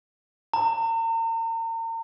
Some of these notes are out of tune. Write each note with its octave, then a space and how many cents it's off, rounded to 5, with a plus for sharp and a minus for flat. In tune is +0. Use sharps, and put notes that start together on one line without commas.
A#5 -40